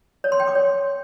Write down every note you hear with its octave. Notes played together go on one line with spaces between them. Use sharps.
C#5
C6
G5
D6
C#5